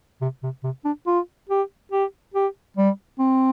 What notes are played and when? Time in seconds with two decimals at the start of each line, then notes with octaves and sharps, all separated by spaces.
0.21 C3
0.43 C3
0.64 C3
0.85 D4
1.07 F4
1.49 G4
1.92 G4
2.34 G4
2.77 G3
3.19 C4